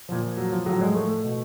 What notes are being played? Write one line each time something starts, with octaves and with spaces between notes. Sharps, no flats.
A#2 F3
F#3
F3
A2 F3 F#3
G#3
A3
B2